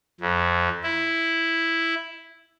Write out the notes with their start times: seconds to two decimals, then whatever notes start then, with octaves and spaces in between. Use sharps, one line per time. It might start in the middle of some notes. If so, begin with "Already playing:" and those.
0.20 F2
0.84 E4